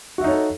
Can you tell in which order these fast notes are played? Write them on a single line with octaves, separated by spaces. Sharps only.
F#4 E5 D#4 C#5 A4